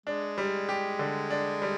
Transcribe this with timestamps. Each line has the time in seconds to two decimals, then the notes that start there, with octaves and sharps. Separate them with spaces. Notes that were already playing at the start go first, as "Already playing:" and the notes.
0.06 G#3 D4
0.38 G3
0.69 G4
0.99 D3
1.30 D4
1.62 G3